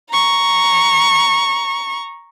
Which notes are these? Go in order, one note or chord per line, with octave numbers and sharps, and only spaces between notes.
A#5 C#6